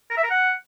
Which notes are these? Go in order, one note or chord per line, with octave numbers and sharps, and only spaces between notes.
A#4
E5
A#4
F#5